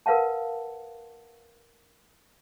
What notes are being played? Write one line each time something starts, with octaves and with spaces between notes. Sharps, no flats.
A#4 B4 F5 F#5 A5